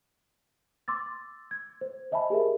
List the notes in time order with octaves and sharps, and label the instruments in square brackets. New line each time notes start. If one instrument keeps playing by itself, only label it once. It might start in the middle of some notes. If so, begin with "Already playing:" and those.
[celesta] C6 D6 E6 A6
G#6
C5
C5 D#5 E5 G#5 A5 B5
G4 G#4 A#4 E5